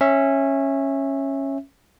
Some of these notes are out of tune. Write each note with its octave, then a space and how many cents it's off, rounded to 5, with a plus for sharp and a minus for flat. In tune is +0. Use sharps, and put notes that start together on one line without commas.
C#4 -15 E5 +0